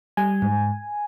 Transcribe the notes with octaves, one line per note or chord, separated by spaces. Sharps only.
G3 G#5
G#2